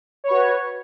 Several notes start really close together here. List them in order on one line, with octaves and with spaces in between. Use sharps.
C#5 B4 F#4